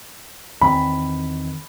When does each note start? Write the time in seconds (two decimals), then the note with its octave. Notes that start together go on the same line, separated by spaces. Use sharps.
0.61 E2 D#3 C4 B5